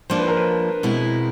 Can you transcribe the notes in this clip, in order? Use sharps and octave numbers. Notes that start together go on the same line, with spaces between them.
F3 A#3 D4 C5
B4
A#4
B4
B2 G#3 C4 E4